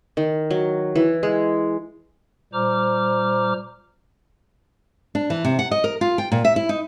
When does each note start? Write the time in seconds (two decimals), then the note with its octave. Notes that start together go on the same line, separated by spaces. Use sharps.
0.17 D#3
0.50 F#3
0.95 E3
1.23 G#3
2.53 A#2 G3 C5 A#5 D6 F6
5.15 D4
5.30 E3
5.45 C3
5.59 F#5
5.71 D#5
5.84 A#4
6.01 F4
6.18 G5
6.32 A#2
6.45 E5
6.56 E4
6.69 D#4